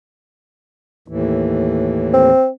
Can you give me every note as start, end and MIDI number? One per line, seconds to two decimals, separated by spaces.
1.08 2.30 39
1.08 2.30 45
1.08 2.30 52
2.13 2.48 60